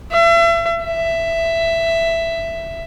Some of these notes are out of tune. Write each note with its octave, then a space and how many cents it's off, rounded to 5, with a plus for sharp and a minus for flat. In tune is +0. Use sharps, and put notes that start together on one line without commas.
E5 +35
E5 +10